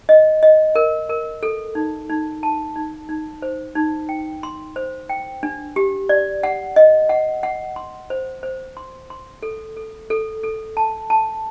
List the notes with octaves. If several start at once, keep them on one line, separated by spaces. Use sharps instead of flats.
D#5
D#5
A#4
A#4
A4
D#4
D#4
A5
D#4
D#4
C5
D#4
G5
C6
C5
G5
D4
G4
D5
F#5
D#5
F#5
F#5
C6
C5
C5
C6
C6
A4
A4
A4
A4
A5
A5